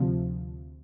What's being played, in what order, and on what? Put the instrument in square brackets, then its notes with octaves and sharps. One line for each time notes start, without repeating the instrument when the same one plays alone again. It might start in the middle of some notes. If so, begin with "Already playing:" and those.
Already playing: [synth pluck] D2 C3 F3